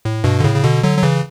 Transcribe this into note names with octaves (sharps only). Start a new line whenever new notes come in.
A2
G2 B2
D3
A2 C#3
C#3
B2 D3
D3 F#3
F#3
C#3 E3